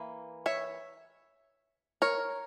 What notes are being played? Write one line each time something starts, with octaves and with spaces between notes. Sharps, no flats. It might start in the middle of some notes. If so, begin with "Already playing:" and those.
Already playing: E3 A#3
C#5 E5
A#4 C#5